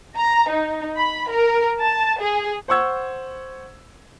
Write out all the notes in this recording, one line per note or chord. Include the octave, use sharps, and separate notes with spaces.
A#5
D#4
B5
A#4
A5
G#4
C5 F#5 C#6 E6 G#6